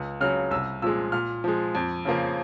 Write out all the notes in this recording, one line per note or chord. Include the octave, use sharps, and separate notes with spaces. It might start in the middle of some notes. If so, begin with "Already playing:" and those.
Already playing: C#2
C#3 F#3 F6
C2 E6
A#2 F3 G#3 E6
A#2 F6
F3 G#3
F2
C#3 F3 A#3